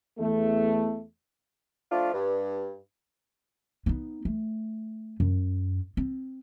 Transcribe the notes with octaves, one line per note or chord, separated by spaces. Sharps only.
E2 A3
F3 A3 D4 F4
G2
B3 D#4
A3
F#2
C4